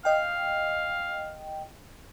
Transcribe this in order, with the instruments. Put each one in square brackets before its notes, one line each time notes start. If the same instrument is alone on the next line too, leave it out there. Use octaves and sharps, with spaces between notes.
[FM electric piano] D#5 G5 [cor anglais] F5